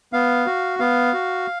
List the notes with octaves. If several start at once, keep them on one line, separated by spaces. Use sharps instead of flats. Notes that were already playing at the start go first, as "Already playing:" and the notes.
B3 F5
F#4
B3 F5
F#4